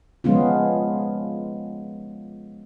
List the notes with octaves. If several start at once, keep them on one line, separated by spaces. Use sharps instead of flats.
F3 G#3 B3 C#4 F4